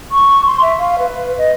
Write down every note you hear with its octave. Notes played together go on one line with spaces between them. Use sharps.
C#6
C6
E5
F5
B4
D#5